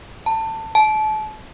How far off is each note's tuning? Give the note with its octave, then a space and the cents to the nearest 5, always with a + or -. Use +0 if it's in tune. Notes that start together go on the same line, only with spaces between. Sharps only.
A5 +20
A5 -35